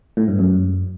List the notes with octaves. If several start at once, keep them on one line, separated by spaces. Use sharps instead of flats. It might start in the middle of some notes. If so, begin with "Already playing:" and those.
A2
G2
F#2